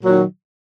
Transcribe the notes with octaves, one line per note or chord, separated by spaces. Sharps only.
A#2 D#3 F#3